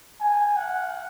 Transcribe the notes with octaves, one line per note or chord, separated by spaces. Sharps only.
G#5
F#5